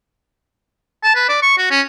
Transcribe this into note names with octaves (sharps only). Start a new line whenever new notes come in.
A5
B4
D5
C#6
F#4
C#4